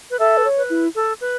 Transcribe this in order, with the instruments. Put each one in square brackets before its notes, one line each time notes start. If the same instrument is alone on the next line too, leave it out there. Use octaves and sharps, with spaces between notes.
[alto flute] B4
[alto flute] A4 [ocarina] E5
[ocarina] B4
C#5
[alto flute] B4
[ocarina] E4
[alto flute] A4
B4